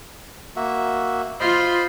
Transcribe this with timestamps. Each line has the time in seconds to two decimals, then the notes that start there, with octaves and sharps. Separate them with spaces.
0.56 A#3 F#4 E5
1.40 F4 C5 D#5 B5